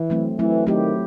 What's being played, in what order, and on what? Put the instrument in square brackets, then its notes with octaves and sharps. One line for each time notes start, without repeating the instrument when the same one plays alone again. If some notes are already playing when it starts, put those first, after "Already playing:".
Already playing: [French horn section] E3
[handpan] F#3 A3 C4
[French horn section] E3 [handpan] F#3 A3 C4
[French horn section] D#3 [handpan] F#3 A3 C4 E4 G4